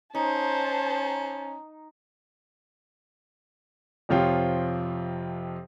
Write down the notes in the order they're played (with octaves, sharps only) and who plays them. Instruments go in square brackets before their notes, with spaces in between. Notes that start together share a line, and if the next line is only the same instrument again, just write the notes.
[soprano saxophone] C#4 [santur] D#4 [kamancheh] C5 A5
[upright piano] F2 C3 F3 F4 C#5 G5